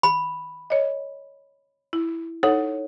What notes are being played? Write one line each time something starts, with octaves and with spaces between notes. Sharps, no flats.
B5
C#5 D#5
E4
D#4 A4 C#5 F#5